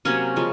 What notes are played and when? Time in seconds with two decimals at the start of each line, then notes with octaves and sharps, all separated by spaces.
0.05 C3 F#3 A#3 C#4
0.36 C#3 F3 G#3